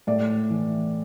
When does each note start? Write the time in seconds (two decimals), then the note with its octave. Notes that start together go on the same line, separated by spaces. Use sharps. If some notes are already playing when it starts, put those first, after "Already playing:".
0.07 A2 D5
0.50 E3